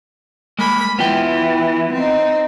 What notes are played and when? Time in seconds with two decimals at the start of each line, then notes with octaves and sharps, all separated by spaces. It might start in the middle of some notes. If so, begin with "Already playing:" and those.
0.59 G#3 A#3 B5
0.99 E3 B3 F4 G5
1.94 C4 D#4